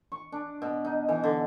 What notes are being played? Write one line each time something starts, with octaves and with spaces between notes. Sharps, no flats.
C#6
D4
B2
D#4
E3
D3